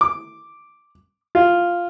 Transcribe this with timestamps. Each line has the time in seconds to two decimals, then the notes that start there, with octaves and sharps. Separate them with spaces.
0.01 D6
1.35 F4